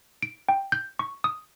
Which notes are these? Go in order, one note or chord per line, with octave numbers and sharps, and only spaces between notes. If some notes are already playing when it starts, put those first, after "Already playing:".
D7
G5
G6
C#6
D#6